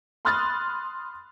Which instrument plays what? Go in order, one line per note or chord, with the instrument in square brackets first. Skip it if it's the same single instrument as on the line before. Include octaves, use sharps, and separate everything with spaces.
[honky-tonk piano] B5 C6 D#6 F6 F#6 A6